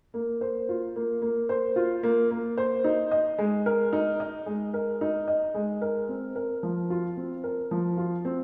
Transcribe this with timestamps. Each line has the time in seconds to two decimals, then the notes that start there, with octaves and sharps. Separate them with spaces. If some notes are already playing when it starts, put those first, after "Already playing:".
0.14 A#3
0.41 C5
0.69 F4
0.96 A#3
1.22 A#3
1.49 C5
1.76 F4
2.03 A#3
2.30 A#3
2.57 C5
2.84 D#4
3.11 D#5
3.38 G#3
3.66 A#4
3.93 D#4
4.20 D#5
4.46 G#3
4.74 A#4
5.01 D#4
5.28 D#5
5.55 G#3
5.81 A#4
6.09 C4
6.35 A#4
6.63 F3
6.90 F4
7.17 C4
7.44 A#4
7.71 F3
7.97 F4
8.25 C4